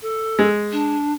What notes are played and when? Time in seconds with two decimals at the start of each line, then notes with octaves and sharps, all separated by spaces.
0.02 A4
0.39 G#3
0.72 D4